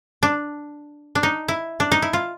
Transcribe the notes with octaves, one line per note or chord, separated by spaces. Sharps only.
D4
D4
D#4
E4
D4
D#4
E4
F4